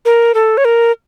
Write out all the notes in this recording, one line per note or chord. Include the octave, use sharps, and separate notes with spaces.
A#4
A4
C#5
A#4